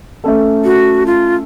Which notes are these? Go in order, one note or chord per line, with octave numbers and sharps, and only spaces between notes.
A3 C#4 A4
F#4
F4